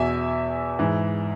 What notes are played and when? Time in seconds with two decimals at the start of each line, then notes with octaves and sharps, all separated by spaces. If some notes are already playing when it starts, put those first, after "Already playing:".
Already playing: E2 B2 E5 G#5
0.79 G#2 E3